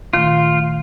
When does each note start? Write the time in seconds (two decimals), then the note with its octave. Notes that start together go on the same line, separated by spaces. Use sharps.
0.13 A#2 D#3 A3 F4